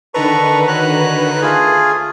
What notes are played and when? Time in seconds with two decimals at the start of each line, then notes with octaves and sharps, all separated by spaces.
0.14 D3 D#3 A4 B4 A#5 C#6
0.68 F#4 C#5 A#5 F#6
1.42 A3 F4 G#4 D#6